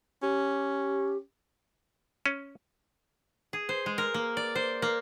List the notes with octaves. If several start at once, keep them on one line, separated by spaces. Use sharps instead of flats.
C#4 G4
C#4
G#4
C5
G#3
A#4
A#3
D5
C5
A#3